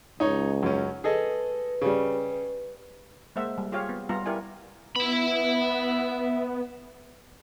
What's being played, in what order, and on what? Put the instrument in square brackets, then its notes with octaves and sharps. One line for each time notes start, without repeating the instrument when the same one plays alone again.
[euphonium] C#2 [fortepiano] D#4 C#5
[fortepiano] F#2 C#4
[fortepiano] G#4 A4 D#5 [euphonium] B4
[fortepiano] C#3 G3
[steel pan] G#3 A#3 C5 E5 F#5
G3
F4 G4 G#4 C#5 F5
B3
G3 B3 F4 A#5
E4 G4 A#4 D5 F5 G#5
[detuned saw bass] B3 [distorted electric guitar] E5 B5